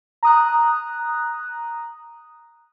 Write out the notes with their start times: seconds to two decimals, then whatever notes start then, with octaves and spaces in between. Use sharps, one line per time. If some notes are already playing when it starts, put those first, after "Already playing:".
0.23 A#5 D#6 F#6